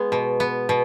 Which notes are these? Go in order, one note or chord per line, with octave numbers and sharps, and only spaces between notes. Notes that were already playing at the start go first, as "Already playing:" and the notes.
Already playing: G#3 B3 G#4
B2
B3
B2